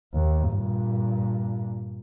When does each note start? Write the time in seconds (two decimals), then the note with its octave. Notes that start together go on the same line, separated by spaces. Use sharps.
0.14 D#2
0.49 G2 A#2